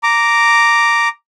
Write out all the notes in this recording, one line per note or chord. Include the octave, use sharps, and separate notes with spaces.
A#5 D6